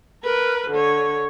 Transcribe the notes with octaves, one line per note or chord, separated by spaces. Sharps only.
A#4 B4
D3 C#5